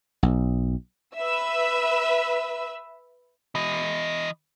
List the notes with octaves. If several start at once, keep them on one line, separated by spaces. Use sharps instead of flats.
B1
B4 E5 E6
E3 D#5